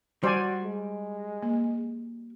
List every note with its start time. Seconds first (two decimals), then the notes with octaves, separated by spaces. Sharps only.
0.24 G3 F#4 C5 D5 G#5
0.64 G#3
1.43 A#3